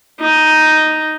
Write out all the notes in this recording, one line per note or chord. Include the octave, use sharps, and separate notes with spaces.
D#4